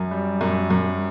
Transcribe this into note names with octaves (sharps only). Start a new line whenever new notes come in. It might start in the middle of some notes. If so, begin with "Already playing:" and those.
Already playing: F#2
G3
F#2
F#2